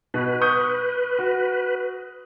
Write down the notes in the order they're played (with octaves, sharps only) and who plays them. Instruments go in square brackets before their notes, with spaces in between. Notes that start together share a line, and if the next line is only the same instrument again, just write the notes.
[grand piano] B2 [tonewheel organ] B4
[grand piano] C#6 D#6 G6
F#4